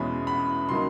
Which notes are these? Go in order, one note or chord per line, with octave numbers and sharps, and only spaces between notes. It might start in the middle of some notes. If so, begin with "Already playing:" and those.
Already playing: E2 B2 G#3 C#4 B5
B5
C#3 F#3 A#3 D#4 C6